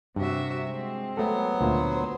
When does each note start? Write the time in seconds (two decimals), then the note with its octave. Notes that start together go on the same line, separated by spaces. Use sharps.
0.16 G2 C3 F#4 E5
0.66 G#3 C4
1.17 F#3 A3 B3 A4
1.61 D2 A#2 A#3 C5